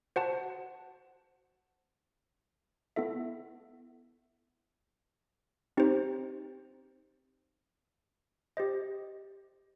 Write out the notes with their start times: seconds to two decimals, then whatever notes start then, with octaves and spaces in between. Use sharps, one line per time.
0.16 F#4 C5 F#5 A5
2.96 B3 E4 A4 E5
5.77 C4 D#4 G4 C5
8.57 G4 C5 D#5